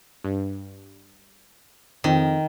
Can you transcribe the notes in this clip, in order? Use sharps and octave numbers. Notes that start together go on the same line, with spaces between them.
G2
F2 D#3